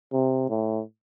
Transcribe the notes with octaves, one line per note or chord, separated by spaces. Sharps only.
C3
A2